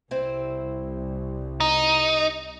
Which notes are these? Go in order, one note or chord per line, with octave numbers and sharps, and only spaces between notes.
C2 C4 E4 C5
D#4